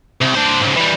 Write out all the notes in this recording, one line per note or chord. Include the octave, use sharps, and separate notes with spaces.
C2
D4 C5
G#2 C#3
E3 G3